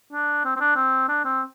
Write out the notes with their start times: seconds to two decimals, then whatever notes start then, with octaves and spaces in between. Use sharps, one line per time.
0.13 D4
0.45 C4
0.56 C4
0.60 D4
0.76 C4
1.09 D4
1.25 C4